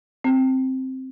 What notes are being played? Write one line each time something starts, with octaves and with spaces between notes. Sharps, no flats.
C4